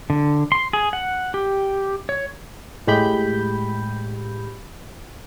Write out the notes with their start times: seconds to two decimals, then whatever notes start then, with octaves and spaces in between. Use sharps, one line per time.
0.10 D3
0.52 C6
0.73 G#4
0.93 F#5
1.34 G4
2.09 C#5
2.87 A2 G#3 G4 B5 G6